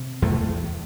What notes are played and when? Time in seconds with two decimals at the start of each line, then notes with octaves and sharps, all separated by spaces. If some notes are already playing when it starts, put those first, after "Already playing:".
Already playing: C3
0.22 E2 A3